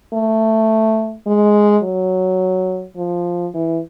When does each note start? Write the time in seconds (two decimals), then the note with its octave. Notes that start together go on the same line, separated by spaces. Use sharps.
0.13 A3
1.27 G#3
1.83 F#3
2.97 F3
3.54 E3